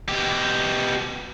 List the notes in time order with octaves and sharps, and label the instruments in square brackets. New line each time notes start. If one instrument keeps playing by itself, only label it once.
[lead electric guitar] B2 G4